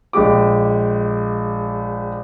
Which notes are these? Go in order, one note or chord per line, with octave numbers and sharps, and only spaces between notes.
A#1 G#3 G4 D6